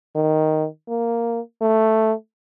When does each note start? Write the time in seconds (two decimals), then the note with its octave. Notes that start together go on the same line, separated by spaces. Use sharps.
0.15 D#3
0.89 A#3
1.62 A3